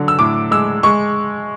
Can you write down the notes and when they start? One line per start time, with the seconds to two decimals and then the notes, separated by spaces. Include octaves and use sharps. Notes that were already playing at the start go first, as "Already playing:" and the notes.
Already playing: D3 F#3
0.08 E6
0.19 A2 D6
0.51 G#3 E6
0.83 G#3 C#6